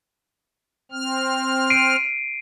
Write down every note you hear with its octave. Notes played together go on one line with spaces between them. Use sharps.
C4 F6
C7 D7 D#7